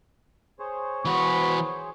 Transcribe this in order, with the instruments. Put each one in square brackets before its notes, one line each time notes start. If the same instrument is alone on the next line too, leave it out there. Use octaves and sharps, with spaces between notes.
[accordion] G#4 C5 C#5
[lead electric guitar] E3 F#4 [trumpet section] B3 B5 C#6